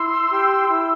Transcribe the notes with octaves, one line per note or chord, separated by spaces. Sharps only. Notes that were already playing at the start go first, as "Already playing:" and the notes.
Already playing: E4 C6 E6
G4
E4